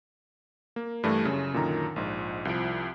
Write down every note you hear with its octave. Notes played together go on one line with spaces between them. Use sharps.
A#3
G2 E3 A3 D4
F#2 C#3
F#2 A#2 D3 D#3 A#5
A#1 G#2
C2 F3 E4 D7